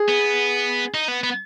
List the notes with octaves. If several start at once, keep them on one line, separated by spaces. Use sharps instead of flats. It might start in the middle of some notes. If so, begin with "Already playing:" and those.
Already playing: G#4
B3
D#4
B3
B3